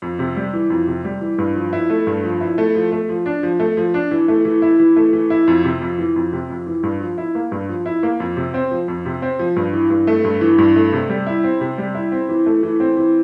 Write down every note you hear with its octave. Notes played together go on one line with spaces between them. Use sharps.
F2
C3
G3
E3
F2
C3
G3
E3
G2
F3
E4
A3
G2
F3
E4
A3
F3
A3
F3
D4
F3
A3
F3
D4
E3
A3
E3
E4
E3
A3
E3
E4
F2
C3
F2
E3
F2
C3
F2
E3
G2
F3
E4
A#3
G2
F3
E4
A#3
F2
C3
C4
F3
F2
C3
C4
F3
G2
E3
G2
A3
G2
E3
G2
A3
C3
G3
E4
C4
C3
G3
E4
C4
E3
A3
E3
C4
E3